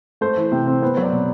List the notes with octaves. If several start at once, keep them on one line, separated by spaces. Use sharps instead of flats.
A3 C5
E3
C3
C4
B3 C5
F#3
D5
B2